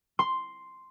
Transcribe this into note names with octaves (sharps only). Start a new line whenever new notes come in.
C6